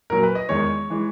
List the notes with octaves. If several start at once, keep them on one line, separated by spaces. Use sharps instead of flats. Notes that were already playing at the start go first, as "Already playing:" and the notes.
A#2 F#3 A#4
B4
D#5
E2 D#3 G#3 C#5
E3 G#3